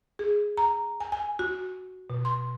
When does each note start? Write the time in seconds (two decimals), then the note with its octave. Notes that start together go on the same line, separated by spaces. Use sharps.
0.19 G#4
0.57 A#5
1.00 G#5
1.12 G#5
1.39 F#4
2.10 B2
2.25 C6